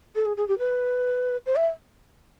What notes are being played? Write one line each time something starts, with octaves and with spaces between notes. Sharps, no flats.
A4
G#4
G#4
G4
B4
C5
E5